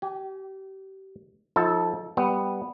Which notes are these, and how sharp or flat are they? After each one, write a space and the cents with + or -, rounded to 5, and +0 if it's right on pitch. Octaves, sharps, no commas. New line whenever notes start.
G4 -30 G#5 +0
F3 +15 D#4 +40 A4 +0
G3 +0 B3 +0